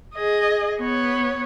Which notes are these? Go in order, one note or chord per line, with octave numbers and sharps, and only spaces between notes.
G#4 D#5
B3 C#5